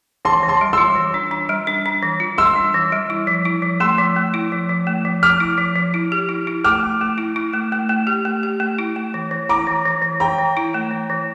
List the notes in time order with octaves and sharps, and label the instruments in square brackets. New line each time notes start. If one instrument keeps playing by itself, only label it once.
[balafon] E3 [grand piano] A5 C6
[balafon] E3
[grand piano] A5 C6
[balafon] G3
[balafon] F4 [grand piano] C6 E6
[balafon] E3
D4
D4
G3
D4
D4
E3
F4
[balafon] G3 [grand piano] C6 E6
[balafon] D4
E3
G3
E4
F3
E4
F3
[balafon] A3 [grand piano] C6 E6
[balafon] F3
A3
E4
F3
F3
A3
F3
[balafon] F3 [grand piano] D6 F6
[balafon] E4
F3
F3
E4
G4
E4
E4
[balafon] A3 [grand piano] D6 F6
[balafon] A3
A3
E4
E4
A3
A3
A3
G4
A3
G4
A3
E4
A3
E3
E3
[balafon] E4 [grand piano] A#5 D6
[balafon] E3
E3
E3
[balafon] E3 [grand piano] G5 A#5
[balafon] E3
E4
A3
E3
E3